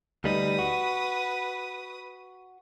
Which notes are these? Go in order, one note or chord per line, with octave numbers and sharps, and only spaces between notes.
D2 G3 D#4 B4 D#6
F#4